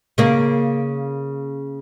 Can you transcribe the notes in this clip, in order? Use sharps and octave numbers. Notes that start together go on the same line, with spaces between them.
C#3 A#3